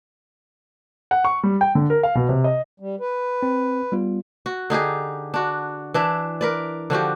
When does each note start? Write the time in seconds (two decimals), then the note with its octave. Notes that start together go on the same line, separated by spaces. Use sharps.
1.11 F#5
1.25 C#6
1.43 G3
1.61 G5
1.75 D3
1.90 A#4
2.03 F5
2.15 B2
2.29 C3
2.44 D#5
2.80 G3
3.00 B4
3.43 C4
3.92 G3 B3 F4
4.46 F#4
4.70 D3 D#4 G4 G#4
5.34 D4 F#4
5.94 E3 D4 E5
6.41 A#4 B4 D5
6.90 D3 F3 F#4 G4